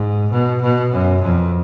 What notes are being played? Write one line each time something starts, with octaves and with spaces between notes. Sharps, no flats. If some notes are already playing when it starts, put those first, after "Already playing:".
Already playing: G#2
B2
B2
F#2
F2